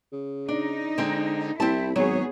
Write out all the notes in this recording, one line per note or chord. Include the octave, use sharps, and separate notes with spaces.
C#3
D4 D#4
D3 G#3 C4
C2 C4 E4 A5
G#1 F#3 B3 G#4 C#5